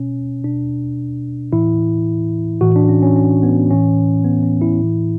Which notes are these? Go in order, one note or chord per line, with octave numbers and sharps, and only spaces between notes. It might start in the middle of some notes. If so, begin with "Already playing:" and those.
Already playing: B2 C#4
B2 D4
A2 E3 E4
A2 E3 F#4
D4
C#4
C#4
C#4
B3
A2 E3 C#4
B3
C#4
E4
A2 E3